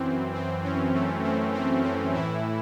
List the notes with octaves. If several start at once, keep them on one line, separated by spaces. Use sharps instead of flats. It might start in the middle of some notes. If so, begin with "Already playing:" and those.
Already playing: F#2 E3 C4
C4
C#4
A3
C4
C4
C4
A2 E3 E4